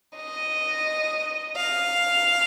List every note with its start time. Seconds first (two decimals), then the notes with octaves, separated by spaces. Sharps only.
0.16 D#5
1.57 F5